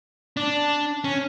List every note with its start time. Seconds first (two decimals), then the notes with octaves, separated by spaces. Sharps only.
0.37 D4
1.04 C#4